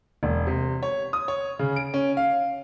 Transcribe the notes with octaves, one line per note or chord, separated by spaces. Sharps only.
E1
C3
C#5
D#6
C#5
C#3
D7
C#4
F5